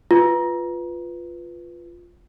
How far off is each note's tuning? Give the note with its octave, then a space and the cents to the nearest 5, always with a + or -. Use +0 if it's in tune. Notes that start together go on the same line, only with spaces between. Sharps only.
F4 +0 B4 +0